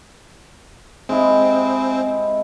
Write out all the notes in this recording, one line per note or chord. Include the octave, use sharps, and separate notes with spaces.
G#3 C4 E4 G4